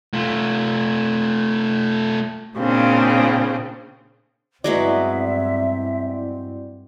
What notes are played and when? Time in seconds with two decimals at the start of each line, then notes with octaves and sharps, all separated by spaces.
0.14 A3 F4
2.57 A#2 C#3 C4 D4
4.64 G2 F#3 G#3 B3 C4 E4 D5 E5